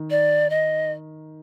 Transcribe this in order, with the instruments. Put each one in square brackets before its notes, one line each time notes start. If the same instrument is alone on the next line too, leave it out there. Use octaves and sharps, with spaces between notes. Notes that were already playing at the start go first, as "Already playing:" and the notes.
Already playing: [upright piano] D#3
[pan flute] D5
D#5